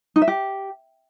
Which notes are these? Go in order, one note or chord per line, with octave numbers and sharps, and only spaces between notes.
D#4
E5
G4